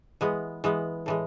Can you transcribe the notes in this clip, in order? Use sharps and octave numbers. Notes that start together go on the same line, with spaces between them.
E3 G#3 B3
E3 G#3 B3
A2 E3 G#3